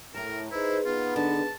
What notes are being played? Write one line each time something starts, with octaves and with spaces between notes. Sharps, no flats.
A2 A#4 A5 A#5
D#4 E4 G#4 B4 C5
B3 D#4 F4
D3 A5